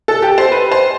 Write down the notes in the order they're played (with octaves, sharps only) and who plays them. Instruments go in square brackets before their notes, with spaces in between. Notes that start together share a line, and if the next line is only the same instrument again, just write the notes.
[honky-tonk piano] A4
G4
C5
B4
C5